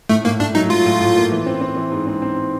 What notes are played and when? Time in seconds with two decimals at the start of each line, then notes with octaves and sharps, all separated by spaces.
0.09 A2 A3
0.25 A2 A#3
0.40 A2 D4
0.55 F#3 D#4
0.70 F#3 F4
0.85 A2
1.01 A2
1.16 A#3
1.32 E3
1.46 C4
1.61 C4
1.76 E3
1.92 G#2
2.07 C4
2.22 C4